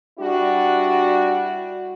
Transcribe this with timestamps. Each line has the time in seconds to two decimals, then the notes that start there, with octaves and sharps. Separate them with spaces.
0.19 G3 D4 E4 F#4